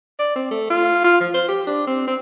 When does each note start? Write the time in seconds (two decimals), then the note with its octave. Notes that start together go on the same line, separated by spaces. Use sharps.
0.19 D5
0.36 C4
0.51 A3
0.70 F4
1.04 F4
1.20 F3
1.35 C5
1.48 G4
1.67 D4
1.87 C4
2.07 C4